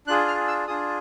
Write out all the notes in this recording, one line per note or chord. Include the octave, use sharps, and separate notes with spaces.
D4 F4 G#4 F#6
F6
E6
D4 F4 G#4 D#6